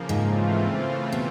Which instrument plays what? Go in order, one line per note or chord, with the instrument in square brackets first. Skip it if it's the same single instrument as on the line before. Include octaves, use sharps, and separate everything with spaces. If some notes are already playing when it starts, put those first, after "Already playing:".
Already playing: [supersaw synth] C#3 F3 A#3
[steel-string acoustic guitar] G#2
[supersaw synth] C#3 E3 A3 C4 F4
[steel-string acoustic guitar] B2